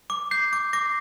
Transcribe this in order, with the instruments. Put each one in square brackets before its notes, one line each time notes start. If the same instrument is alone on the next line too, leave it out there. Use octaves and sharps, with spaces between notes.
[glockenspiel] D6
[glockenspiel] G6 [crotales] C7
[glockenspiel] D6
[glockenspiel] D6 [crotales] A#6